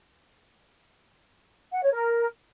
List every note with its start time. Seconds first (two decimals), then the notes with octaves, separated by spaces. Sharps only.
1.72 F#5
1.82 C#5
1.91 A#4